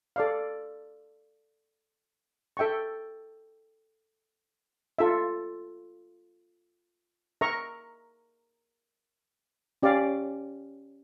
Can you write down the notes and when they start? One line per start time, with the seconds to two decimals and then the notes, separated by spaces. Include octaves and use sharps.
0.16 A4 D5 F5
2.57 A4 E5 G5 C#6
4.99 F4 A4 E5
7.41 A#4 E5 A#5 C#6
9.83 C#4 G4 D5 F5